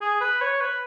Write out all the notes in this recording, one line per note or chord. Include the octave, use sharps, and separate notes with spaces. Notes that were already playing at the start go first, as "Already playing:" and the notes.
G#4
B4
C#5
B4